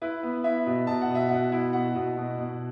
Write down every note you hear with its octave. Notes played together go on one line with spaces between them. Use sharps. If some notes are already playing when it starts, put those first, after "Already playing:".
E4 B4
B3
E4 E5
B2
B2 A5
F#5
B2
E5
B2 F#5
E4
B2 F#5
B2
B2
B2